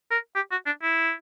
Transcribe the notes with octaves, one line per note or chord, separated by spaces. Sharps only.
A#4
G4
F#4
D4
E4